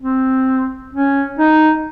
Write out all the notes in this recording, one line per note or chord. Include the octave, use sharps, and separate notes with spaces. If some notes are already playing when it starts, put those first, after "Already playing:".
C4
C#4
D#4